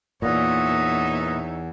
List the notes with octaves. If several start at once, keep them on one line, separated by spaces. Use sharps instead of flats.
E2 A#2 B3 D#4 C#5 D#5 E5